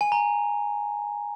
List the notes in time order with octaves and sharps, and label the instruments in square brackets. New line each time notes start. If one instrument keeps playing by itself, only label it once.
[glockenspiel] G#5
A#5